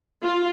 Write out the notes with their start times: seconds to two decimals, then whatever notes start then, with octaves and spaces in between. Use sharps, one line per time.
0.21 F4